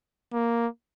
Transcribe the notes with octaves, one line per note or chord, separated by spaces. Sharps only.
A#3